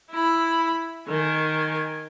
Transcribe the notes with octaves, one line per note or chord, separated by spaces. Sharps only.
E4 B5
D#3 G#5